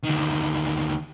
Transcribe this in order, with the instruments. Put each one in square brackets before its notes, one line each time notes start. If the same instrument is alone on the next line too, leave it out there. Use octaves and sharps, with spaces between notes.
[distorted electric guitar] D2 D#3